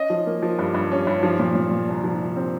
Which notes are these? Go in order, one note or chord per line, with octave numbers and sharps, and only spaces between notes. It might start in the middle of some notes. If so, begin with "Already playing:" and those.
Already playing: C#4 D#5
F3
A#3
F3
G2
G2
C#4
G2
F3
A#2
A#2
A#2
C2
F3
C2
C4